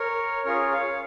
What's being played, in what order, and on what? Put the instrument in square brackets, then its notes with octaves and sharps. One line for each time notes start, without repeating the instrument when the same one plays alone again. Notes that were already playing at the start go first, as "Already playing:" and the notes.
Already playing: [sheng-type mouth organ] A#4 C#5
C#4 F4 G#4 A#4 C#5
C#5 F5